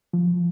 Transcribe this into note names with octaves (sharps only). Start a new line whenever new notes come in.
F3